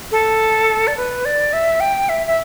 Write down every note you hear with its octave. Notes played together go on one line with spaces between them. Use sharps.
A4
D5
B4
D5
E5
G5
E5
E5